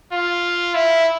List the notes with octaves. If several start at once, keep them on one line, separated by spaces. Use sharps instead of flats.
F4
E4